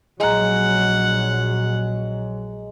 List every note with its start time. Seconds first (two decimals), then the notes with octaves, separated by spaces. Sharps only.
0.20 A#1 F#3 G#3 F#5 A#5